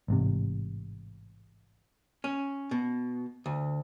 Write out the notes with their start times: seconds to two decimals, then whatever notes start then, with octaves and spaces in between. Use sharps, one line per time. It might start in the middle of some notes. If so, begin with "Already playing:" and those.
0.08 A1 G#2 C3
2.24 C#4
2.71 B2
3.46 D2